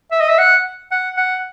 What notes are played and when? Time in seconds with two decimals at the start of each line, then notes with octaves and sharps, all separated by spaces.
0.11 E5
0.21 D#5
0.29 E5
0.38 F#5
0.91 F#5
1.17 F#5